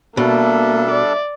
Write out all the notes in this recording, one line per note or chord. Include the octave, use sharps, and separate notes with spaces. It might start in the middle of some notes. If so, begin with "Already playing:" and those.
B2 G3 A#3 D4 A4 E5
D5